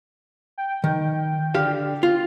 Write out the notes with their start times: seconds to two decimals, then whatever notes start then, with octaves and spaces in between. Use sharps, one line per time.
0.58 G5
0.84 D#3
1.55 D3 G4 F5
2.03 F4